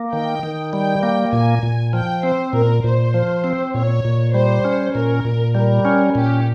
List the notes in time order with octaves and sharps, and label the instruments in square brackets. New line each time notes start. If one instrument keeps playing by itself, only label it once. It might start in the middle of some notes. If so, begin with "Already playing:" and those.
Already playing: [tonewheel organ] A#3
[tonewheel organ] D#3 [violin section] G5
[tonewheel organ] D#3
[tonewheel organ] G3 [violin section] G5
[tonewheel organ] A#3
[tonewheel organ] A#2 [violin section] G#5
[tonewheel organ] A#2
[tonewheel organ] F3 [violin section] G5
[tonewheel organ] C4 [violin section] C5
[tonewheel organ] A#2 [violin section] A#4
[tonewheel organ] A#2 [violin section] C5
[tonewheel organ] F3
C4
[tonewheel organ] A#2 [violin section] C#5
[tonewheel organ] A#2
[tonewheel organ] G3 [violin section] C5
[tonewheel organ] C#4
[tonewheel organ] A#2 [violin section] A#4
[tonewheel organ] A#2
[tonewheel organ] G3 [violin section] A#4
[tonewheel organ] C#4
[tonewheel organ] A#2 [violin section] G4